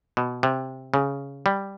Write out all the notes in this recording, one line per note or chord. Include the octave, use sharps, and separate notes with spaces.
B2
C3
C#3
G3